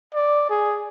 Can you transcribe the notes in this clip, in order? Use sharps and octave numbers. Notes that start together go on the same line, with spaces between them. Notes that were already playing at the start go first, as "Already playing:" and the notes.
D5
G#4